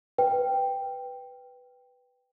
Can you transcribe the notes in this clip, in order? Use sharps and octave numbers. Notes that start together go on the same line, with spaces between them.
B4 G5